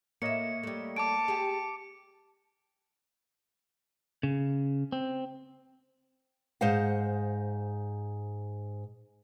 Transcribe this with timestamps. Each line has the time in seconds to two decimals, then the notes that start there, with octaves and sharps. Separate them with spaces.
0.22 A2 A#3 C#5 D#5 E5 C#7
0.63 G3 A3
0.96 A5 D6 D7
1.28 G4 G#4
4.23 C#3
4.92 C4
6.61 G#2 C5 F5 F#5